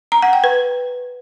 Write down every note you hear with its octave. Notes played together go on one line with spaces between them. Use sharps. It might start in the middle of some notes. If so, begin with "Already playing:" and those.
A#5
F#5
G5
B4